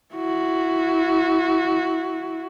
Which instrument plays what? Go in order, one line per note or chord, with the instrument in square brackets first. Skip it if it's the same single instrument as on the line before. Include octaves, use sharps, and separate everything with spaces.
[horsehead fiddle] E4 F#4